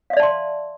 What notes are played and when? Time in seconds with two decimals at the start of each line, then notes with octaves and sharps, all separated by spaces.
0.10 F5
0.13 E5
0.17 D5
0.20 A5
0.23 C6